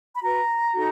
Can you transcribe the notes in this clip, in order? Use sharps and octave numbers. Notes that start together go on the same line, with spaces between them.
B5
F#4 B4 A#5
D#4 F#4 A4